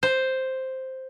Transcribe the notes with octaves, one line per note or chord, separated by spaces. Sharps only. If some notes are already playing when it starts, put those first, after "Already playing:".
C5